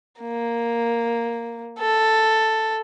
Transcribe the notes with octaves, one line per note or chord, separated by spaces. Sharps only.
A#3
A4